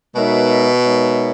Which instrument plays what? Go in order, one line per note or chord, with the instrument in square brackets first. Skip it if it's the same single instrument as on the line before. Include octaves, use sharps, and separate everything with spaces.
[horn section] B2 [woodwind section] G#3 D#4 A#4 C#5 E5
[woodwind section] G#3 D#4 A#4 C#5 E5